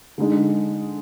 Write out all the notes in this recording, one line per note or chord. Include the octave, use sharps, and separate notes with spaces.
D3 G#3 D#4